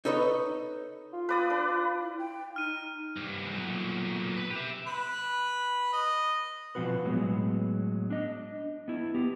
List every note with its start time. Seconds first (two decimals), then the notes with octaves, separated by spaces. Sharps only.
0.05 D#4 A4 B4 C#5 D#5
1.13 F4
1.29 B4 D5 D#6
1.50 D4 B4
1.69 F4
2.02 E4
2.19 G5
2.56 D#4 F6 D#7
3.16 C2 G2
3.52 B1 A#2
4.36 B4
4.51 G4 E5
4.86 B4
5.93 D#5
6.75 B2 F3 C4 F#4 B4
7.05 A2 F#3 G#3 B3
8.10 D4 D#5
8.88 B3 E4
9.14 B3 G4